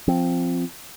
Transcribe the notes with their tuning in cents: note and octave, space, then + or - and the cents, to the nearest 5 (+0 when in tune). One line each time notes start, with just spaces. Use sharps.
F3 +0 C4 +0